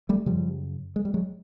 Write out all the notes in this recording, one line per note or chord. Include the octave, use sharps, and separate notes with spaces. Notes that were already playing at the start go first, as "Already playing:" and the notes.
G3 A3
F#2 C#3 F3 G3
G#3
G3
F#3 G#3